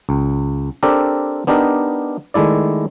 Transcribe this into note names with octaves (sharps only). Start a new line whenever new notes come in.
C#2
C4 D4 G4 A4 A#4
B3 D4 D#4 G4 A#4
D#3 G#3 A3 E4 D5